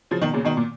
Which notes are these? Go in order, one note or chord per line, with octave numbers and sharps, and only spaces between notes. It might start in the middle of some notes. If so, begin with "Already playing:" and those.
C#3 F3
B2 D#3
A#2 C#3
B2 D#3
A#2